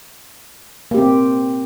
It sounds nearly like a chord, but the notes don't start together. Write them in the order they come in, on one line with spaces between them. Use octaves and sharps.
A#3 G4 C4